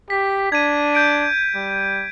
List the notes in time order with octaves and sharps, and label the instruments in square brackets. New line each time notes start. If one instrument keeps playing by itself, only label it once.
[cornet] G4 [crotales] B6
[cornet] D4 [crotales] G#6 D#7
[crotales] G6 D7
[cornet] G3